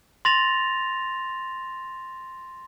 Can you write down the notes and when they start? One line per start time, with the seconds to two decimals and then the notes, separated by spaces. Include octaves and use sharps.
0.25 C6 A6 A#6 F7